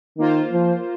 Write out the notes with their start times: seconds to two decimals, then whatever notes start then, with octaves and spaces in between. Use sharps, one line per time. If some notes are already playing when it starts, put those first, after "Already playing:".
0.19 D#3 A#3 F4 C5
0.52 F3